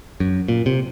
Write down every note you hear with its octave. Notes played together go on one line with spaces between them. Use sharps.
F#2
A#2
C3